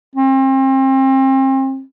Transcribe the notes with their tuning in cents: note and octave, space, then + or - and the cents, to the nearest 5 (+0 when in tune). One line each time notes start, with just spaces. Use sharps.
C4 +35